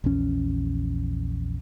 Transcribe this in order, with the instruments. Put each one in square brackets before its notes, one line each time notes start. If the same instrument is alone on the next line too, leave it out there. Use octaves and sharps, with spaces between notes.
[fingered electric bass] A#1 E2 C#4